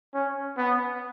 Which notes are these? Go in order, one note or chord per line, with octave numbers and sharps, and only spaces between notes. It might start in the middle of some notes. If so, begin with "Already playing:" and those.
C#4
B3